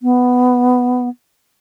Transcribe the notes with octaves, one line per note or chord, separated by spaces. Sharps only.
B3